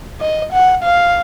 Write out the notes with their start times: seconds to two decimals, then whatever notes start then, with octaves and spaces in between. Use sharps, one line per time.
0.21 D#5
0.53 F#5
0.83 F5